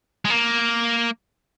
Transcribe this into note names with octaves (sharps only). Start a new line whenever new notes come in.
G#3
A#3